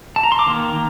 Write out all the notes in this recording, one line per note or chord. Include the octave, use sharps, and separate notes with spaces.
A5
A#5
C6
D6
D#3 A#3